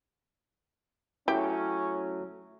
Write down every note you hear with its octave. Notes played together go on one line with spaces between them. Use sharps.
F#3 A3 C#4 E4 G4